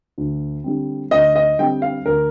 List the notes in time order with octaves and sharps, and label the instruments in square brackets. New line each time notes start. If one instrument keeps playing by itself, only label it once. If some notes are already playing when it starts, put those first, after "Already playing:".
[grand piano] D2
D3 G3 C4
[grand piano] D2 [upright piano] D#5
[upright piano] D#5
[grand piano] D3 G3 C4 [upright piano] G5
[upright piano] F5
[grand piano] D2 [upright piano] A#4